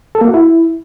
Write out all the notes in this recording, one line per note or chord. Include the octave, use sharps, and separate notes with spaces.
A4
A#3
F#4
E4